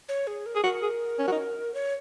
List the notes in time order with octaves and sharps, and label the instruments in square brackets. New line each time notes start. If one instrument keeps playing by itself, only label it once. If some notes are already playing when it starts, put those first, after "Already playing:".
[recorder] C#5
G#4
A#4
[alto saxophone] G#4
[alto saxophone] F#4 [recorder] A#4
[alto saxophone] G#4
C#4
F#4
D#4
[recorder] C#5